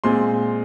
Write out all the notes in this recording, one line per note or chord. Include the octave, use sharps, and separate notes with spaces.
A#2 G#3 C4 C6